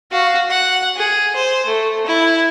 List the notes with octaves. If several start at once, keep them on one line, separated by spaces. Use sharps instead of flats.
F#4 F5
F#5
G#4
C5
A3
E4